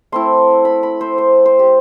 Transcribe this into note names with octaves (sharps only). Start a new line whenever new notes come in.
A3 C4 E4 C6
B5
B5
C5
C5
C5
G4